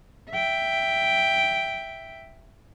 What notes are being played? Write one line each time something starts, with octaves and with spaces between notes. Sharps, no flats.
E5 G5